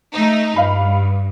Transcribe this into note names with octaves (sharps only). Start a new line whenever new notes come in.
A3 D#4
G2 F5 B5